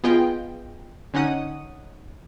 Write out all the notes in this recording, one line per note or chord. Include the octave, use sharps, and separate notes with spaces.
B3 F4 G#4 D#5 G5
D3 C#4 D#4 F#5 D#6